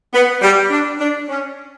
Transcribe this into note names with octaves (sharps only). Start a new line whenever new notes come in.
B3
G3
D4
D4
C#4